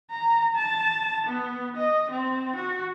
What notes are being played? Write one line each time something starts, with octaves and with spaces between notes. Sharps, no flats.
A#5
A5
B3
D#5
C4
F#4